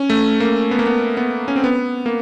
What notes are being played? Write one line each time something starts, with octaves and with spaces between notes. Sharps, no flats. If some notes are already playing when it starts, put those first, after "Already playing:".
Already playing: C#4
A3
A#3
B3
A#3
B3
B3
C#4
C4
B3
A#3